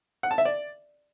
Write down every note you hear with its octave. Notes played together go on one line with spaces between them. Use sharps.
F#5
A5
E5
D5